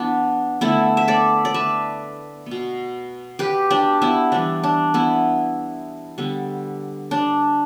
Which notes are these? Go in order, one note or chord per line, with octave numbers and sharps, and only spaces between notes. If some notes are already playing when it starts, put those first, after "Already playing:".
Already playing: E3 B3 D4 E4
D3 A3 B3 E4
E5
A4 D5
D5
B4 E5
B3
B2
G4 B4
D4 G4
B3 E4
E3 G3 B3 D4
D4
B3 E4
D3 G3 B3
D4